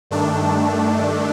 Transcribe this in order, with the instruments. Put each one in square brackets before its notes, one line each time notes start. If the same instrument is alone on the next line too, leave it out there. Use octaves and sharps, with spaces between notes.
[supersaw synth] G2 D#3 A3 D4